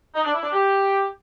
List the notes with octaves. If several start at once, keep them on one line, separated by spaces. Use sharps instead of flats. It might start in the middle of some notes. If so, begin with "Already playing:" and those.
D#4
D4
E4
D4
G4